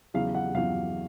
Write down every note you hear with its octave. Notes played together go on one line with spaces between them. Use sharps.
E2 C#3 F#3 F5
F#5
E2 C#3 F#3 F5